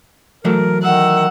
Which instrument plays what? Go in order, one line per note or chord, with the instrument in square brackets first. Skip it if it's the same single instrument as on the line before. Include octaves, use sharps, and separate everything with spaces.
[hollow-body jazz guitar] E3 F#3 A3 [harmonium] A#4
[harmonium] D#3 [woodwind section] A#4 E5 E6 [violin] F#5